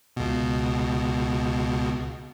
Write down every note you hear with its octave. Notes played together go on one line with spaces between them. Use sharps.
C#2 B2